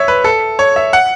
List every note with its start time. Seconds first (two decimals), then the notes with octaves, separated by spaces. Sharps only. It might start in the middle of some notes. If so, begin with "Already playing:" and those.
Already playing: C#5 E5
0.08 B4
0.24 A4
0.59 C#5
0.76 E5
0.93 F#5